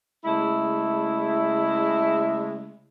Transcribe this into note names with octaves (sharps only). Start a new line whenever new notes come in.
C#3 G#3 A3 E4